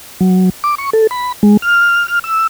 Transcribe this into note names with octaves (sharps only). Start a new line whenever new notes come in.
F#3
D6
C#6
A4
B5
G#3
F6
F6
E6